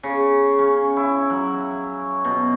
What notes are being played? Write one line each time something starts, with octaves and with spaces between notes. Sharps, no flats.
C#3
C#4
E4
F#3
B2